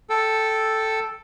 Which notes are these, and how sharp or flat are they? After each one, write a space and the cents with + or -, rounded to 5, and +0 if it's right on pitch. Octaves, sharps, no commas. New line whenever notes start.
A4 +0 G5 -5